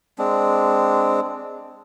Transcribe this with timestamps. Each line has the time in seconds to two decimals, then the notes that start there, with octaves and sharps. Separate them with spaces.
0.18 G#3 C4 D4